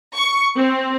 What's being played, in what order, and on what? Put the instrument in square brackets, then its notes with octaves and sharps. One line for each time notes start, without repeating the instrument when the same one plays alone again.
[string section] C#6
C4